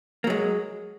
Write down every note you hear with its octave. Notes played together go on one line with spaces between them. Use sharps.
F#3 G#3 A#3